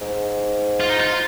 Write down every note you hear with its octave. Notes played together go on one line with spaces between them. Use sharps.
G#2
F4
D#4
F4